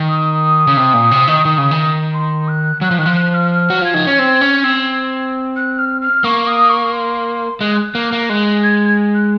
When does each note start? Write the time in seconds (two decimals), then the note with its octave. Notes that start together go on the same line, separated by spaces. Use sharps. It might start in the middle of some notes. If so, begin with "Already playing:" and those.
Already playing: D#3
0.08 D#6
0.67 C#3
0.77 C3
0.94 A#2
1.11 C3
1.28 D#3
1.45 D#3
1.58 C#3
1.71 D#3
2.13 C6
2.48 F#6
2.81 F#3 F#6
2.91 F3
2.98 D#3 F#6
3.06 F3
3.17 F#6
3.33 F6
3.51 F6
3.70 F#4
3.82 F4 G#6
3.94 D#4
4.07 C#4
4.19 C4
4.41 C#4
4.64 C4
5.56 F#6
5.78 F6
6.01 F6
6.24 A#3 C#6
6.46 D#6
6.69 C#6
6.92 C6
7.61 G#3 F#6
7.95 A#3
8.12 A#3
8.29 G#3 F#6
8.63 G#6
8.85 G#6
9.14 F#6